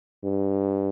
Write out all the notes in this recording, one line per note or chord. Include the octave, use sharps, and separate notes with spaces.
G2